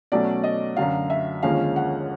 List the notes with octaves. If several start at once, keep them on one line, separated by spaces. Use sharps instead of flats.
B2 F#3 A3 C#4 D5
D#5
F#2 D3 F#3 F5
E5
D#2 D3 F3 G#3 C#4 F5
F#5